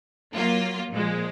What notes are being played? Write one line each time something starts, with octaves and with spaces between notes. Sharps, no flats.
F#3 A#3 F4
A#2 F3 G#3